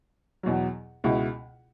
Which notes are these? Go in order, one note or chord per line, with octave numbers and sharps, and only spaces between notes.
E2 B2 F#3
C#2 B2 G#3 E4